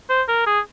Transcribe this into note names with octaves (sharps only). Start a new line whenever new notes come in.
C5
A#4
G#4